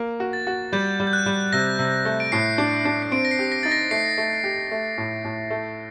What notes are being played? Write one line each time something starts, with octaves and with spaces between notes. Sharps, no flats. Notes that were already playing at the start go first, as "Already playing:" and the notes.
Already playing: A#3
F#4
A6
F#4
G3 G6
G3
G6
F#6
G3
C3 A#6
C3
A3
D7
A2 C7
D4
D4
C7
C4 D7
A#6
C7
G4
A#6
D#4 A6
A#6
A3 C7
A3
G4
A3
A2
A2
A3